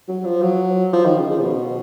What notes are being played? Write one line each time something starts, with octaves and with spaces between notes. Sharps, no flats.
F#3
F3
F#3
F3
D#3
C#3
F3
C#3
B2